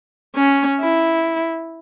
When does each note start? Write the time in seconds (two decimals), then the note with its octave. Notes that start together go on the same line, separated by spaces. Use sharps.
0.36 C#4
0.80 E4